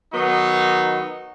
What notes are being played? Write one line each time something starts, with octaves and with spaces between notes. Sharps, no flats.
D#3 F#3 B3 D#4